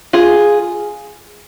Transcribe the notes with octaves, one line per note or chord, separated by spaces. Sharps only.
F4 G#4